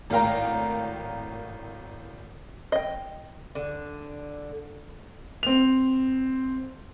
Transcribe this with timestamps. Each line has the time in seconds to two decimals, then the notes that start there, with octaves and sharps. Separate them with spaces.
0.10 G#1 A2 A#4 F5 G5 A#5
2.72 D#5 G5
3.55 D3
5.43 C4 F7